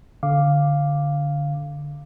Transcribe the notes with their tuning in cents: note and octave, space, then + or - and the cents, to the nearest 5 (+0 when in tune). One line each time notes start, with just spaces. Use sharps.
D3 -15 F5 +0 D6 +0